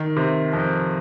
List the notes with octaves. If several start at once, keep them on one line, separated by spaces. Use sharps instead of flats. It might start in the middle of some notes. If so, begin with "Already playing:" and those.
Already playing: D#3
C3
F2